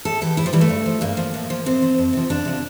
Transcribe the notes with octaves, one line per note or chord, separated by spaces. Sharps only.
A2 A4
E3 G4
A2 E4
F3
E3 G3
A3
G2
F3
G2 A#3
F3
A2
F3
A2 C4
F3
F2
C3 F3
F2 D4
C3 F3